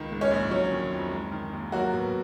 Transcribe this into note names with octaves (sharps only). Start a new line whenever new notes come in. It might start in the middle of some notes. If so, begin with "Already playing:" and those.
Already playing: C#2 D#3
G#2
C#4 C#5
A#1
F#3 C#4 C#5
D#3
F2
G#3
D#3
D#2
F#3 A#3 F#4
B2